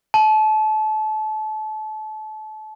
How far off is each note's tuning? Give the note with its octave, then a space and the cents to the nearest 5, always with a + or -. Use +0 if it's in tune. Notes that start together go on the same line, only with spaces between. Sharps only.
A5 -30